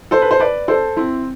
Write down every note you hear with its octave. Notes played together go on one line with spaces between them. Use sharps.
A4 C5
B4
C5
B4 D5
A4 C5
C4 E4